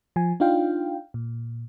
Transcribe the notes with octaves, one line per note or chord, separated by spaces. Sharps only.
F3 G#5
D4 D#4 F4 F5 G5
A#2